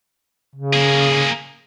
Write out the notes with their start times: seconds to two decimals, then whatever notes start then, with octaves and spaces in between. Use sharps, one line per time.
0.55 C#3
0.74 A#3 G#4